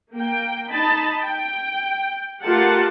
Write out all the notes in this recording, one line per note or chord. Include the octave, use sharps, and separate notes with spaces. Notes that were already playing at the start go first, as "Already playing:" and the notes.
A#3 G5
D#4 D#5 A5 B5
G5
A3 F4 G4 A#4 F#5 A5